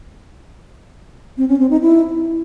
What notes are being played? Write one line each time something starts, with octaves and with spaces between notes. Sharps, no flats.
C4
C#4
C4
D#4
E4